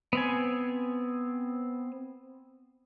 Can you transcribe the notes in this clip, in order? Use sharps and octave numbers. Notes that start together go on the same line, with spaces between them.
B3 C4 G#5